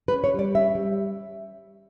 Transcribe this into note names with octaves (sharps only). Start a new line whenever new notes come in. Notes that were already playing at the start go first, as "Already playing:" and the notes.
B4
C#4
C#5
G3 D5
C#4 E5
G3